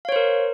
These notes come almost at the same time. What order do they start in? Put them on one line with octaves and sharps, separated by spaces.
F5 C#5 C5 A#4